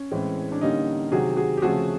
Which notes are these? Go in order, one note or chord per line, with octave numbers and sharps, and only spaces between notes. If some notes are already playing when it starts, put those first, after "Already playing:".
Already playing: C#4
A2 E3 G#3 C4
D4
D3 G3 A#3 C#4 D#4
C3 D#3 F#3 F#4 G#4
F#4 G#4
G4
C#3 F3 A3 C4 F#4 G#4